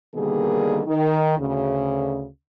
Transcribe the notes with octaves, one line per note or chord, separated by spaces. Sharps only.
B2 D3 D#3 G3 A#3 G#4
D#3
D2 C#3